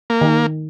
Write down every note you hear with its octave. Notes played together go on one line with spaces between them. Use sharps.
A#3
D#3